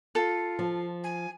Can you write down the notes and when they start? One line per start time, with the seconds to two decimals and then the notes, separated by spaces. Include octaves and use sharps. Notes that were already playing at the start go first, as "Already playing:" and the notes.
0.15 F4 A4
0.59 F3
1.04 G#5